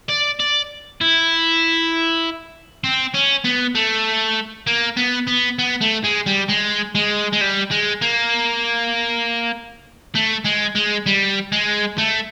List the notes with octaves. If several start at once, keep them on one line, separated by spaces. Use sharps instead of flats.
D5
D5
E4
C4
C#4
B3
A3
A#3
B3
B3
B3
A3
G#3
G3
G#3
G#3
G#3
G3
G#3
A#3
A3
G#3
G#3
G3
G#3
A3